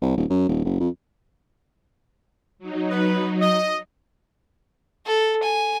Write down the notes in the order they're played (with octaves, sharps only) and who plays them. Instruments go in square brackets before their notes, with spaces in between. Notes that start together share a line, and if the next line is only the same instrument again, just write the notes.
[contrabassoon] C2
D#1
F#2
D#1
F#1
F2
[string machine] F#3 D#4
[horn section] B3 B4
D#5
[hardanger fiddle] A4
G#5